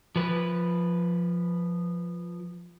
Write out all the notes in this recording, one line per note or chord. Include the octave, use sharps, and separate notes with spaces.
F3 B4